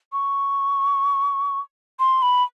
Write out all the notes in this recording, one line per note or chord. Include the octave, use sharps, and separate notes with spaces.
C#6
C6
B5